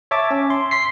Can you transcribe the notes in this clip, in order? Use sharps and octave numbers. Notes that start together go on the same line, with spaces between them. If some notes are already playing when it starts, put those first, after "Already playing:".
C#5 E5 A5 D6
C#4
C6
C6 B6 C7